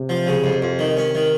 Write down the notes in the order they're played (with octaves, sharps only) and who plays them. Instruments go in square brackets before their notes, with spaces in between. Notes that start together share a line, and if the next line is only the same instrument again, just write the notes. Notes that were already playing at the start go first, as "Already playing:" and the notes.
Already playing: [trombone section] C3
[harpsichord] F3
C#3
F2
F2
D#3
C#4
D#3